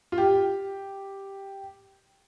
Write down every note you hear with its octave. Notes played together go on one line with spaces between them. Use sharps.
F4
G4